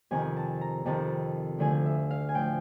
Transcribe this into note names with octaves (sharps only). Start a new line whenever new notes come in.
F2 C3 D#3 G#5
A5
A#5
F2 C3 D#3 A5
D2 D3 F3 G#5
E5
F5
G#5
A2 F3 G5